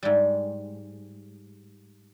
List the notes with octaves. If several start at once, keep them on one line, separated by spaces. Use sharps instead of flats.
G#2 G3